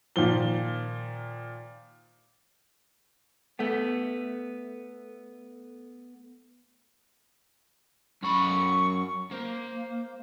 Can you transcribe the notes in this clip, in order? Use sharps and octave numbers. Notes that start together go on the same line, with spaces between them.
A#2 D#3 F3 G7
A3 B3
F#2 B5 C#6
A#3 C5